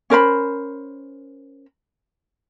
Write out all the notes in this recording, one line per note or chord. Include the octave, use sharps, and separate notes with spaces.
C#4 A#4 C5 B5